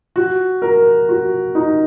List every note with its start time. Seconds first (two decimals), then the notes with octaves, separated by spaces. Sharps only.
0.16 F#4
0.62 A#4
1.09 F#4
1.55 D#4